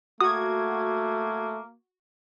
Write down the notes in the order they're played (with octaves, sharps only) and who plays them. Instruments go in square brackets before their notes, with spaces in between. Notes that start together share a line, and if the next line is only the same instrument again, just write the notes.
[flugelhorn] A3 [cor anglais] A#3 [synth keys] F#4 G#6 [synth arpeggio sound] D#6